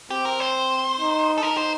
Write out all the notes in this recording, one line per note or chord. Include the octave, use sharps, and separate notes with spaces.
C4 G4
A#4
C5
D#4
A4
D#4 A#4
C5